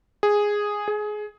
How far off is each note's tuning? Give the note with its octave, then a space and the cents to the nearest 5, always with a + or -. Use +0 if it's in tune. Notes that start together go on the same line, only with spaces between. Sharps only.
G#4 -5
G#4 +20